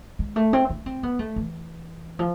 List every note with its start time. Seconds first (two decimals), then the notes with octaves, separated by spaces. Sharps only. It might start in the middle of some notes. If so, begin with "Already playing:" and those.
0.19 G#3
0.36 A3
0.53 C4
0.70 D4
0.86 C4
1.03 B3
1.19 A3
1.36 E3
2.19 F3